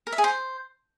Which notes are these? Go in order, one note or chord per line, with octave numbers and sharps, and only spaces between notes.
A#4
E5
G#4
C5